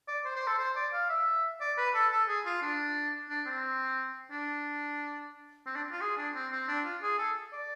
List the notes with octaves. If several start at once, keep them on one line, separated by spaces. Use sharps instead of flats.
D5
C5
C5
A4
C5
D5
F5
E5
D5
B4
A4
A4
G#4
F4
D4
D4
C4
D4
C4
D4
F4
G#4
D4
C4
C4
D4
F4
G#4
A4
D5